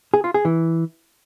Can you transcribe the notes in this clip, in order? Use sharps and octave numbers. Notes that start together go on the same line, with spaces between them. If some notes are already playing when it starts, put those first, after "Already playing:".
G#4
F4
G#4
E3